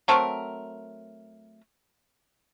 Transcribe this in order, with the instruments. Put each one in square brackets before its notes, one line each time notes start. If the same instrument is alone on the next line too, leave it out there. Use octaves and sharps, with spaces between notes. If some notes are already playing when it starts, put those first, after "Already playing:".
[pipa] F#3 A3 C4 A#4